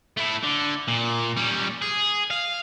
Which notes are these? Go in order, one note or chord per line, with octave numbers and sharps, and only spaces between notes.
A3 E4
D3
A#2
G3 C#4
G#4
F5